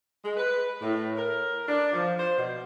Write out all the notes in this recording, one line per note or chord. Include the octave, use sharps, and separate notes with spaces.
G#3
B4
A2
A#4
D4
F3
C5
B2